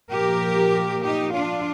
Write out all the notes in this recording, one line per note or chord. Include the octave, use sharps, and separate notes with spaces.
A#2 F3 G4 A#4
D#4 G4
D4 F4